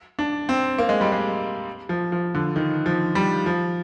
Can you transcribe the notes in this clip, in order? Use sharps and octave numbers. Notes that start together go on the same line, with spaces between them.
D4
C4
A#3
G#3
G3
G#3
F3
F3
D3
D#3
F3
G3
F3